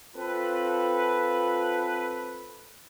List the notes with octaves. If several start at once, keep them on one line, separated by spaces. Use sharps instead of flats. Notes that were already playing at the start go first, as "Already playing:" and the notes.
C4 F4 A4 B4